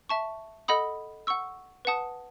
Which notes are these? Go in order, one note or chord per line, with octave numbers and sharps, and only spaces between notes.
E5 A5 C#6
A4 D#5 F#5 B5 D#6
F#5 C#6 E6
B4 F#5 A5 D#6